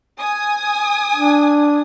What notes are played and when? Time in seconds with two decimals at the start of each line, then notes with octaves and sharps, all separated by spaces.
0.19 G#5 D#6
1.16 D4